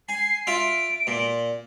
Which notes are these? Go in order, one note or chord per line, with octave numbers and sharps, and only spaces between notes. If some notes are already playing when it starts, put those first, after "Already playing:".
G#5 C7
F4 E5 D7
A#2